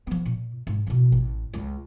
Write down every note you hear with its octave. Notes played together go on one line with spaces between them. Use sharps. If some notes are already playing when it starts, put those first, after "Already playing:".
F3 B3
A#2
G#2
A1 B2
A1
C#2 F4